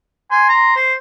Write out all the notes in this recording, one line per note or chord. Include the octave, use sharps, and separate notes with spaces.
G#5 C6
A#5
C5